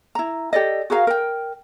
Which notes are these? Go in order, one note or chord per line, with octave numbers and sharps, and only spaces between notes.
E4 A#5
G4 A4 D5 D#5
F#4 G#4 A#4 F5
A#4 G5